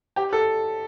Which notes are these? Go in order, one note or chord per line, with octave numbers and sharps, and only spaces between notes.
G4
A4